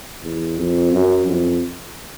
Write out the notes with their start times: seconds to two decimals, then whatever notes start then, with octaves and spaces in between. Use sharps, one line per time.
0.23 E2
0.57 F2
0.92 F#2
1.26 F2